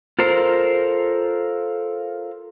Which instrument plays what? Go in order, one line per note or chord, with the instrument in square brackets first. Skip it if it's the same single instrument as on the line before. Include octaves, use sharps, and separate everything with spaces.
[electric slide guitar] F4 A4 A#4 C5